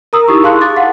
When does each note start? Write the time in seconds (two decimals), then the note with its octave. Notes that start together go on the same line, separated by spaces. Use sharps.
0.13 A#4 A#5 D#6 E6
0.28 D#4 E4 G4 C#6
0.43 G#4 F5 A5 C6 F#6
0.61 D6 A6
0.77 F5 F#5